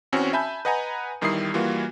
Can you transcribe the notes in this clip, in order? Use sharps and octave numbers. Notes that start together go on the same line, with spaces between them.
E2 C4 C#4 F#4
E5 G#5 A5 B5 G6
B4 D#5 F#5 G#5 A#5
E2 D#3 G3 E4 D#6 C7
E3 G3 A#3 F4 F#4